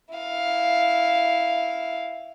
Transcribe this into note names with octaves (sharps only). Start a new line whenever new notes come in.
E4 F5